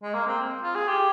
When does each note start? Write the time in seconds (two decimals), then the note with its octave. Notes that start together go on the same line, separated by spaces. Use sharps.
0.02 G#3
0.14 A#3
0.27 C4
0.63 F4
0.75 G#4
0.88 G4